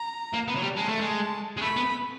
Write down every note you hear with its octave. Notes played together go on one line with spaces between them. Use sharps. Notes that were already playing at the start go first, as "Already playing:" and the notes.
Already playing: A#5
A#3
B3
F#3
G3
G#3 A5
A3
G#3
G#3
A3 B5
B3